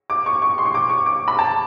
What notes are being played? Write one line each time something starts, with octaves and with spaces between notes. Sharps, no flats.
D6
C#6
C#6
C6
C#6
D6
C#6
D6
B5
A5